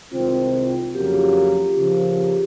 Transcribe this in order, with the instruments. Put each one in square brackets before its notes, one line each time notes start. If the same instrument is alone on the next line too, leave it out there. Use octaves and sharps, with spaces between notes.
[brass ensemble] C2 C3 D#3 G#3 C4 [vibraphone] F4
[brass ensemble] F2 C#3 F#3 A#3 [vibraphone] G4
[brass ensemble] C#3 F3 A#3